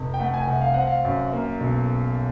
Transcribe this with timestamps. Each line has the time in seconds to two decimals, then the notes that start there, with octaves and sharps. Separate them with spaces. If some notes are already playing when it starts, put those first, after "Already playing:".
Already playing: F1
0.14 G5
0.20 A3 F#5
0.34 G#5
0.42 G5
0.48 C2 F#5
0.62 F5
0.74 C4 F#5
0.87 F5
1.05 F#2
1.33 A#3
1.60 B1